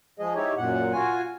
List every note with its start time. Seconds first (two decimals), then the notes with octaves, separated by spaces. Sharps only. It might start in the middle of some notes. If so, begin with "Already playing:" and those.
0.19 F3 G#3 G#4 D#5
0.35 D#4 E4 G4 C#5
0.57 F#2 A#2 F#5
0.93 F4 F#4 G#5